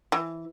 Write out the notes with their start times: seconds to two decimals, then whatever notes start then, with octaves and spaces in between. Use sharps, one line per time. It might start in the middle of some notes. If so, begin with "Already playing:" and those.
0.12 E3